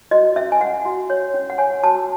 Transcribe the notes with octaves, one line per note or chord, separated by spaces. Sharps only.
F#4 D#5
C#4 E5
G#5
C#4 F#5
F#4
C#5
C#4
F#5
C#5 G#5
F#4 A5